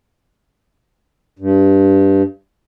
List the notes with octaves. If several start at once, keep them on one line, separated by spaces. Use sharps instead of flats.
G2